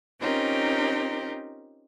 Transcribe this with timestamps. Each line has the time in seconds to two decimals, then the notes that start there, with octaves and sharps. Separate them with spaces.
0.20 C4 C#4 D#4 F4 G4 A#4